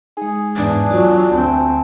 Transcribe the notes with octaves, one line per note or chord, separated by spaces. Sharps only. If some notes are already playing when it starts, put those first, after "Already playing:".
G#3 D#4 G#4
E2 G#2 D4
F#3 F4 F#4
D2 C4 G#5 A5